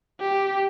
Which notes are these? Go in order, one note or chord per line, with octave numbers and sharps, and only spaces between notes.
G4